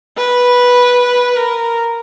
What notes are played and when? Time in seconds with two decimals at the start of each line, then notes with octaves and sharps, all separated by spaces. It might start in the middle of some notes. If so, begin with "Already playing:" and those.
0.17 B4
1.36 A#4